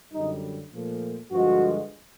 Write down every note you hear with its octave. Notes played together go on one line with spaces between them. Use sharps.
F#2 D3 G3 D#4
A#2 F3 A3
G2 D3 F3 G#3 F#4